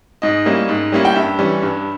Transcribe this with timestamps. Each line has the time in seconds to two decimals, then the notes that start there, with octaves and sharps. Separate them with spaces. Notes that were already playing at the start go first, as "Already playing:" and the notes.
0.22 G#2 D#5
0.46 G3 A#3 C#4 E4
0.69 G#2
0.92 G3 A#3 C#4 E4
1.05 G5
1.16 G2 E5
1.39 E3 G3 C#4
1.63 G2